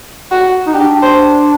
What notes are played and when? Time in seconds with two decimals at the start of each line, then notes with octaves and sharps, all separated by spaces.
0.31 F#4
0.67 D#4
0.74 D4 G4
1.02 C5